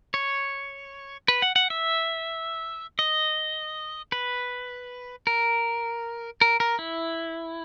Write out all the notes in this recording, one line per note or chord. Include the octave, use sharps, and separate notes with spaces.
C#5
B4
F#5
F#5
E5
D#5
B4
A#4
A#4
A#4
E4